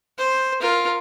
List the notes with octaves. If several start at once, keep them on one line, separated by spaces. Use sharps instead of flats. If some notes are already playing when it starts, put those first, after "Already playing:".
C5
F4 A#4